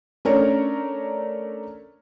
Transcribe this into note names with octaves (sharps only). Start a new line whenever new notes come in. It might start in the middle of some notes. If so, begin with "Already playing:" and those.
A3 C#4 D4 A#4 C#5 D5